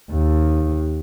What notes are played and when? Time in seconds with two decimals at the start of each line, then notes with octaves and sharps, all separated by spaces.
0.12 D#2